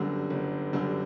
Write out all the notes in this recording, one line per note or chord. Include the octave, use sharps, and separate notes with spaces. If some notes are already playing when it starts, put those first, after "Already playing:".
Already playing: G1 F#2 D3 G3
G1
F#2 D3 G3